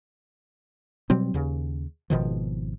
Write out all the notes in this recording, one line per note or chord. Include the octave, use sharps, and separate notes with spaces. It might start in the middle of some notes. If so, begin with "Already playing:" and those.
B2 F#3 G3 C4
D#2 C#3
G#1 B2 D#3 F3